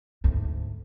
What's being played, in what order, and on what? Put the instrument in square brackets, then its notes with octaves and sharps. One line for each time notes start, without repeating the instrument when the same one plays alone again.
[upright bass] D2 G#2